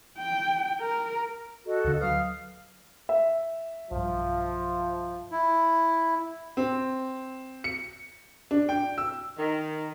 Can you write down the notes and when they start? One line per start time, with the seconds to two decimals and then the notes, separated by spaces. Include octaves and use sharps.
0.18 G5
0.81 A#4
1.67 F#4 A4 D#5
1.85 D2 D3
2.01 F#3 B4 F5 D#6 F6
3.09 E5
3.91 B1 G2 F3
5.32 E4
6.57 C4
7.64 C#7
8.51 D4
8.69 G5
8.98 E6
9.38 D#3